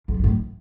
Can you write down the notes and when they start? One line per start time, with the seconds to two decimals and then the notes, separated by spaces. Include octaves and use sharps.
0.08 F2
0.19 F#2
0.24 A2